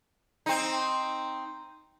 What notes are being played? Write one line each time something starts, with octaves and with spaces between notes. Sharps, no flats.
C4 D#4